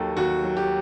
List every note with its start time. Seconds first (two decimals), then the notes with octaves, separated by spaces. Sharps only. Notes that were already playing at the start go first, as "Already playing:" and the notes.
Already playing: D#2 D#3 F#3 G4 A4
0.17 D#2 F#4
0.44 F#3
0.57 G4